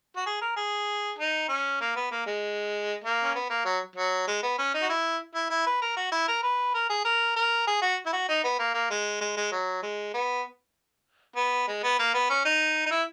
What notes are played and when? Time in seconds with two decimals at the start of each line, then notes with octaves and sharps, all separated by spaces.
0.16 F#4
0.26 G#4
0.41 A#4
0.56 G#4
1.18 D#4
1.49 C#4
1.81 A#3
1.96 B3
2.11 A#3
2.27 G#3
3.04 A#3
3.24 C#4
3.35 B3
3.49 A#3
3.65 F#3
3.96 F#3
4.27 G#3
4.43 B3
4.58 C#4
4.74 D#4
4.83 F#4
4.89 E4
5.34 E4
5.50 E4
5.66 B4
5.82 A#4
5.96 F#4
6.12 E4
6.28 A#4
6.43 B4
6.74 A#4
6.89 G#4
7.04 A#4
7.36 A#4
7.67 G#4
7.82 F#4
8.06 E4
8.13 F#4
8.29 D#4
8.44 B3
8.59 A#3
8.74 A#3
8.91 G#3
9.21 G#3
9.37 G#3
9.52 F#3
9.82 G#3
10.14 B3
11.36 B3
11.67 G#3
11.83 B3
11.99 A#3
12.14 B3
12.30 C#4
12.45 D#4
12.86 D#4
12.91 E4